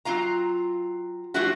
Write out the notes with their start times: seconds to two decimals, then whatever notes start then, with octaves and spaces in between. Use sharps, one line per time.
0.05 F#3 C4 F4 F5 A#5
1.34 F3 G3 A3 D4 E4 F#4